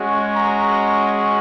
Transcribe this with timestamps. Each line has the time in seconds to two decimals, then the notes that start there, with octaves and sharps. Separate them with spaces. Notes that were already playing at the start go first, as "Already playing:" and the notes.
Already playing: G#3 C#4 F#4
0.35 A#5